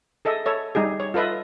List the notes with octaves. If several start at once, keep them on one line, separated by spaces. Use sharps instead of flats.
G#4 A4 D#5 E5
A4 C#5 E5
G3 D#4 G4 G#4
C#5
F4 A4 B4 D#5 E5